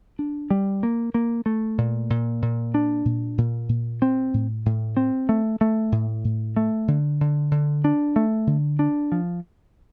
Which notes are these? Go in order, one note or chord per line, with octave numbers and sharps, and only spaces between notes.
D4
G3
A#3
A#3
A3
A#2
A#2
A#2
D4
A#2
A#2
A#2
C4
A2
A2
C4
A3
A3
A2
A2
A3
D3
D3
D3
D4
A3
D3
D4
F3